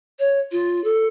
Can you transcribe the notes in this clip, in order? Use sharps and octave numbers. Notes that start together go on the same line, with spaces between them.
C#5
F4
A4